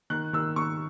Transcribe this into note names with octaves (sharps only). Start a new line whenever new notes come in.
D#3 F#6
D#3 E6
D#3 C#6